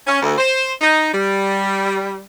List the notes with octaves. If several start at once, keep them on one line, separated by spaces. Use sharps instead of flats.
C#4
D2
C5
D#4
G3